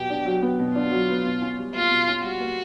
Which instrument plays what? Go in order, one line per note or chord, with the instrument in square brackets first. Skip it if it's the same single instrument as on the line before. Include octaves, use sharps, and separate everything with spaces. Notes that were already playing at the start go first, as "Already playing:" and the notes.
Already playing: [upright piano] B2 F#3 B3 [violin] G4
[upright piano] D4
F#3
B3
B2
[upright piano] D4 [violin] F4
[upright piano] F#3
B3
B2
C#4
G3
[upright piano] A#3 [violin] F4
[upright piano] B2
C#4
[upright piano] G3 [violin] F#4
[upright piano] A#3